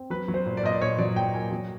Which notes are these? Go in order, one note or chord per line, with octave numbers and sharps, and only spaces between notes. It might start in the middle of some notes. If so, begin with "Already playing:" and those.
Already playing: C4
F#3 B4
F#3
C5
A#2
D5
A#2 D#5
D5
A#2 C#5
F#3 D5
A#2 G5
A#3 G#5
F#3